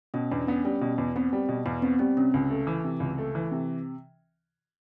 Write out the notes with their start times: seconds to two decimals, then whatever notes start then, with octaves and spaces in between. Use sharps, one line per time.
0.14 B2 C#4
0.31 E2 D4
0.47 B3 C#4
0.65 G3 C#4
0.81 B2
0.98 E2
1.16 B3 C4
1.33 G3
1.49 B2
1.66 E2 B3
1.82 B3 C4
1.99 G3 C4
2.17 C3 C#4
2.34 C#2
2.51 A3
2.67 E3
2.84 C3
3.00 C#2
3.18 A3
3.35 E3
3.51 C3